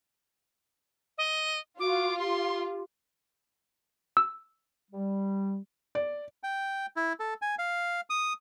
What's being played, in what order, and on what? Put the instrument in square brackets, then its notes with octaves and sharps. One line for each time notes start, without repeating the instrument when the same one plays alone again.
[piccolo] D#5
[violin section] F4 [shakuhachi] F#4 [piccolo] D6
[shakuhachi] G4 [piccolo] C6
[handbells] E6
[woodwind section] G3
[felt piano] D5
[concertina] G5
E4
A4
G#5
F5
D#6